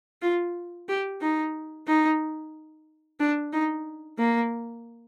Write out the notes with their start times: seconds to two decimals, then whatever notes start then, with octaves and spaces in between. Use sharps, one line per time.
0.22 F4
0.88 G4
1.21 D#4
1.87 D#4
3.20 D4
3.53 D#4
4.19 A#3